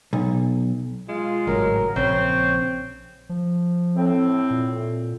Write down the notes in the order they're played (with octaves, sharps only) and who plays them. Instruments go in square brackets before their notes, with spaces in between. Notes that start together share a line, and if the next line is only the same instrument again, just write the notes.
[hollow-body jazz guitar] B1
[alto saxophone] G#3 [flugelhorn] F4
[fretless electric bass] G#1 A2 C#3 [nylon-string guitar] F#3 [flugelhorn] A#4
[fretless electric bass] A#1 [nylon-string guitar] C#3 E5 [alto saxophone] C4 [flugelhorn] C#5
[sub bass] F3
[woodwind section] A2 C4
[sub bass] A#2